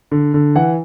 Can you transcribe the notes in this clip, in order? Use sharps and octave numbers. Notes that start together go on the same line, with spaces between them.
D3
D3
E3 F#5